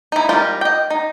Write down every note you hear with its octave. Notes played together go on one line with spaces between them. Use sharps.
D#4 E4
G3 G#3 F4 G4 A#4
D#5 G5
D#4